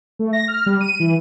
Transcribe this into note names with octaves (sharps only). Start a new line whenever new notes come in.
A3
A#6
F6
G3
D#7
E3